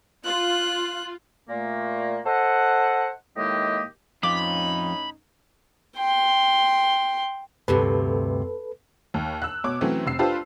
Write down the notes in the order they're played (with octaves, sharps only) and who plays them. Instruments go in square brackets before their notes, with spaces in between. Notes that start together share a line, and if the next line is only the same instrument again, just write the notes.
[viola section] F4 [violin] F#6
[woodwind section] A#2 A3 A#3
A4 C5 D#5 F#5
A2 D#3 G#3 A#3 G4 D#5
[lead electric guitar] F2 F4 [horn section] A2 C#4 D#4 [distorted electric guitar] B5 [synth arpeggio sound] D6
[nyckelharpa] G5 C6
[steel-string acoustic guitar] D2 G2 C3 [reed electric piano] A4 B4
[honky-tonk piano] D#2
E6 F#6
B2 C#5 D6
E3 F#3 A3 C4 C#4
F1 C3 E6 C7
D4 F4 G4 A4 B4 C5